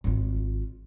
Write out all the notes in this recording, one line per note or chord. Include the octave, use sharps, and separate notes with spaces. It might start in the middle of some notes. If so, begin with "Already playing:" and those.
G#1 F4